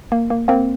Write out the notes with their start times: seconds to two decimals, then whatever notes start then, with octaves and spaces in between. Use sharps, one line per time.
0.12 A#3
0.30 A#3
0.48 A#3 C4